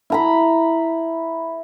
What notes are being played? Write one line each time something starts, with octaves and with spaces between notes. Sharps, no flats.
E4 A#5 B5